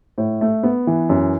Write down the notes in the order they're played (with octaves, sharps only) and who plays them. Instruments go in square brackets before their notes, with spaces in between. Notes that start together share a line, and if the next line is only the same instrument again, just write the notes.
[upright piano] A2
A3
B3
E3
F#2